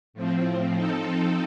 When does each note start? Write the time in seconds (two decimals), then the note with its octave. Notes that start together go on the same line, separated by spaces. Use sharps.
0.14 A2 F3 C4
0.74 F3 C4 D#4 A4